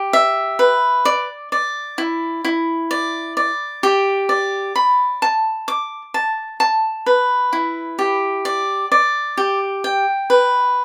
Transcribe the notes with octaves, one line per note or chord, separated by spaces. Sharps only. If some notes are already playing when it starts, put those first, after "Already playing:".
Already playing: G4
E5
B4
D5
D5
E4
E4
D5
D5
G4
D5
B5
A5
D6
A5
A5
B4
E4
G4
D5
D5
G4
G5
B4